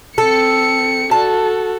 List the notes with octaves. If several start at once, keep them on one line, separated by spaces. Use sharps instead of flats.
C4 A4 C#7
F#4 A4 A5